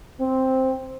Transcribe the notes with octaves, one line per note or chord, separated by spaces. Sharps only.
C4